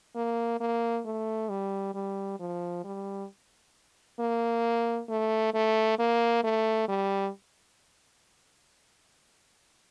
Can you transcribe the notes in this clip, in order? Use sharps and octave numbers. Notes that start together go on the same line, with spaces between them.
A#3
A#3
A3
G3
G3
F3
G3
A#3
A3
A3
A#3
A3
G3